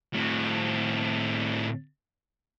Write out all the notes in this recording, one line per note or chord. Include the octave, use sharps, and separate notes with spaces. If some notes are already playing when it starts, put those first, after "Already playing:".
A2 C4